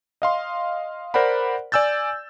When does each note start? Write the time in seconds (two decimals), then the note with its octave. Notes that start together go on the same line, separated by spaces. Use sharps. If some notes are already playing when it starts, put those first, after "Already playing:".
0.22 D#5 F5 C6
1.14 A#4 C5 D5 F#5 B5
1.72 D5 G#5 E6 G6 A6